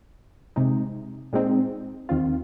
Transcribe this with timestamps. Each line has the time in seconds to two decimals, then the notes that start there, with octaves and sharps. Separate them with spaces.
0.56 C3 G#3 D#4
1.33 A#2 G#3 C4 D#4
2.09 D#2 D#3 C4 F4